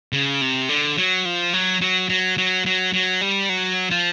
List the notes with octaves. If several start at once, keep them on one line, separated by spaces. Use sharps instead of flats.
C#3
C3
D3
F#3
F3
F#3
F#3
F#3
F#3
F#3
F#3
G3
F#3
F3